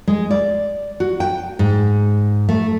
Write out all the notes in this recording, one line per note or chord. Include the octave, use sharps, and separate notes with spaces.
G#3
D5
F#4
G5
G#2
A3